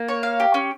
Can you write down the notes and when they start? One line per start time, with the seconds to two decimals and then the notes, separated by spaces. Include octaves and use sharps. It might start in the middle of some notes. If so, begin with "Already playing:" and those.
Already playing: A#3
0.08 C#5
0.23 F5
0.40 G4
0.54 C#4